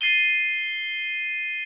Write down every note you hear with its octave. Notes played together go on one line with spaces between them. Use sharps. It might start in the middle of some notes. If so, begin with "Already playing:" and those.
A6 C7 D#7 G7